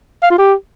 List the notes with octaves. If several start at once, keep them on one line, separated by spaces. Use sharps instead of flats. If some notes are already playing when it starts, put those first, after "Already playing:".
F5
F4
G4